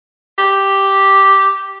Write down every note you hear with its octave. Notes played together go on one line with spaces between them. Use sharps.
G4